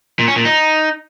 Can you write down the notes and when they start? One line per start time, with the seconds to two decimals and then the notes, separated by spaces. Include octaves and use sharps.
0.19 A#2
0.28 C#4
0.36 A#2
0.45 D#4